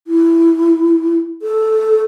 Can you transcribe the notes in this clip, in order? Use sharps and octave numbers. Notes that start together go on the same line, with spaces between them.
E4
A4